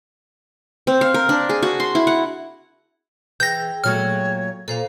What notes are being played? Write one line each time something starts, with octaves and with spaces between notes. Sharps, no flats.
C4
F5
A#4
D4
G#4
F#4
C6
E4
F#5
E3 G#4 G5 G6 A#6
A#2 F#3 A3 C#5 F6
A#2 A4 C5 F5